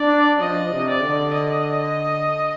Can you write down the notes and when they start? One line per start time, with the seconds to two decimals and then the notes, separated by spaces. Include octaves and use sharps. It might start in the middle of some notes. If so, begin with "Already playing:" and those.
Already playing: D4 D5
0.40 F3 D#5
0.72 C3
0.87 D5
1.02 D3
1.34 D#5